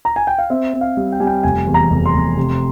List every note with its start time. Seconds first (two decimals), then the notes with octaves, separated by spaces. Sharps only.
0.05 A#5
0.16 G#5
0.27 G5
0.38 F5
0.50 C4 E5
0.73 C4
0.81 F5
0.97 G3
1.12 G5
1.20 G3 G#5
1.27 G5
1.43 F1 G#5
1.67 E2
1.74 A#5
1.90 F1
2.06 C6
2.13 F1
2.37 C3